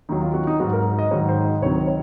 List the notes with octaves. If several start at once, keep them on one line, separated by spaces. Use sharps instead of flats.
D#2 D#3 F#3 D#4
F4
F#4
D#4
G#2 F#3 F#4
A#4
D#5
G#2 D#3 F#3 C#5
C5
D#5
C#2 C3 D#3 F#3 C#5
C#5